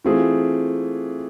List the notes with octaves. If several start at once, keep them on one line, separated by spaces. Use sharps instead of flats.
E3 A3 C4 F4 G#4